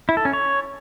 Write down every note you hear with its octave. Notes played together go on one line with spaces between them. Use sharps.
E4
A4
C#4
C#5